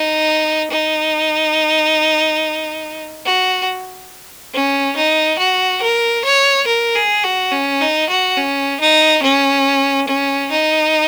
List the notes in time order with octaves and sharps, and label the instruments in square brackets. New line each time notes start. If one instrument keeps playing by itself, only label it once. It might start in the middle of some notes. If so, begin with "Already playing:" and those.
Already playing: [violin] D#4
D#4
F#4
C#4
D#4
F#4
A#4
C#5
A#4
G#4
F#4
C#4
D#4
F#4
C#4
D#4
C#4
C#4
D#4